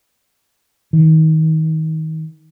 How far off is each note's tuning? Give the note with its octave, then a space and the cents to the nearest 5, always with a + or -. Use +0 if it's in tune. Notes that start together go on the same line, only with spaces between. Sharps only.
D#3 +30